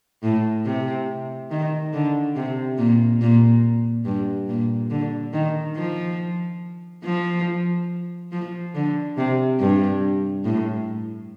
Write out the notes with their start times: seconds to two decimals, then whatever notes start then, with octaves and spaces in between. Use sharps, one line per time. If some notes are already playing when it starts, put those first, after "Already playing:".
0.23 A2
0.66 C3
1.51 D#3
1.93 D3
2.36 C3
2.78 A#2
3.21 A#2
4.05 G2
4.48 A#2
4.90 D3
5.33 D#3
5.76 F3
7.04 F3
8.32 F3
8.75 D3
9.17 C3
9.60 G2
10.45 A2